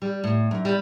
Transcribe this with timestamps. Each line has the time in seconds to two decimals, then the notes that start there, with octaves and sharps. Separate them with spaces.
0.02 G3
0.24 A2
0.51 F#2
0.65 G3